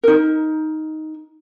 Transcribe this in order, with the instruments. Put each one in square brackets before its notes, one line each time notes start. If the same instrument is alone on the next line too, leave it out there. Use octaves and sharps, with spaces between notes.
[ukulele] D#4 A#4